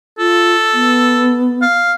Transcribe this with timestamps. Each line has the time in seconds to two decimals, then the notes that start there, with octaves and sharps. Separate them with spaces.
0.19 F4 A4
0.74 B3
1.62 F5